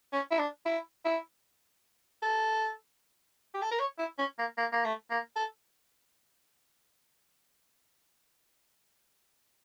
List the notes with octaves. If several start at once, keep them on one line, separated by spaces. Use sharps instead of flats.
C#4
E4
D4
E4
E4
A4
G4
A4
A#4
C#5
E4
C#4
A#3
A#3
A#3
A3
A#3
A4